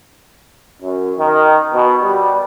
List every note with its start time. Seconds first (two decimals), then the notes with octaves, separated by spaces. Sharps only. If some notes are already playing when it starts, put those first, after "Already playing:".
0.81 F#2
1.18 D#3
1.73 B2
2.02 G3